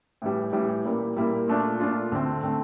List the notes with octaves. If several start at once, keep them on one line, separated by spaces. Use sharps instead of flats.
A2 E3 G3
A2 E3 G3
A#2 G3 A#3 E4
A#2 G3 A#3 E4
A#2 A3 D4 F4
A#2 A3 D4 F4
D2 D3 A3 C4
D3 A3 C4